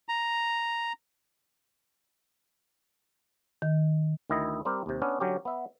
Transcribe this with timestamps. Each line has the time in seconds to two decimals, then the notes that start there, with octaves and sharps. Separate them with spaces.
0.09 A#5
3.62 D#3
4.30 D2 D#3 E4 D#5
4.65 G3 C4 G4 A#4
4.86 D#2 C3
5.02 B3 C#4 D4
5.20 D3 F#3 C#4 G4
5.45 B3 E5